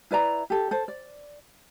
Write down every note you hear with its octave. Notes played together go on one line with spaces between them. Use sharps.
E4 B4 D5 A#5
G4 A4
A4 C5
D5